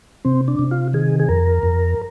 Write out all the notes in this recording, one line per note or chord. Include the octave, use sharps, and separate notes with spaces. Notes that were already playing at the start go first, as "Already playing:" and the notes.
C3 C4
D4
C3
F4
D#3 G#4
G#4
F2 A#4
F2